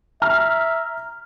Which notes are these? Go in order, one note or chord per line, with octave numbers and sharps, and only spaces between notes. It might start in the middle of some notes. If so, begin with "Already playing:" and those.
E5 A#5 F6